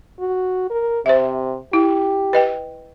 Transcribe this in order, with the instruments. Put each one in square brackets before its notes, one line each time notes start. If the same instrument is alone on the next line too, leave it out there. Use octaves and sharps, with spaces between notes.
[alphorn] F#4
A#4
[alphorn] C3 [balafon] C5 E5
[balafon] E4 [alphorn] G4
[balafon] B4 D#5 G5